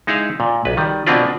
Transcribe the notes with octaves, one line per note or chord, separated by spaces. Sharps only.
G#3 D#4 E4 G#4 F5
A#2
B1 B4
D#3 G3
B2 A#3 C4 D4 F4 B4